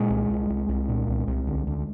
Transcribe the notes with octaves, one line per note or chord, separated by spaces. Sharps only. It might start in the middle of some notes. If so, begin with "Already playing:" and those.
Already playing: A#2 G#3
C2
C2
C2
C2
A#2
C2
C2
D2
D2